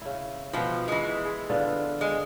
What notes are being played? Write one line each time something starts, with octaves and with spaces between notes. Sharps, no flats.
C#3 E4
B2 F3 B3 G5
E3 G#3
G#4
D3 B3 F4
G#3